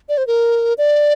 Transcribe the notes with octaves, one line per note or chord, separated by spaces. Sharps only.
D5
C5
A#4
D5